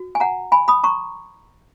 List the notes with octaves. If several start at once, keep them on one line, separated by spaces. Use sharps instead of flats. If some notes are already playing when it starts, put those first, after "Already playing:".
Already playing: F#4
G#5
F#5 A#5
G#5 B5
B5 D#6
A#5 C#6